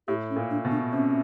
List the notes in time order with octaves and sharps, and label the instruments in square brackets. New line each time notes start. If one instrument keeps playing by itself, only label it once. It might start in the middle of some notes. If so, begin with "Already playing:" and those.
[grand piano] A2 [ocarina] G4
[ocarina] C#4
[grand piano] A#2
[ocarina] D4
[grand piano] B2
[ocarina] D4
[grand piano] C3 [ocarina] C#4